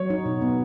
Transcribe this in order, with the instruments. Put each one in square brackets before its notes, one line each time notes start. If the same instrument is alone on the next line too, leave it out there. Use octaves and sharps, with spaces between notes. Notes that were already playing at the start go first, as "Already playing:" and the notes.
Already playing: [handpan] F#3 [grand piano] C#5
[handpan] D#4
B2
B3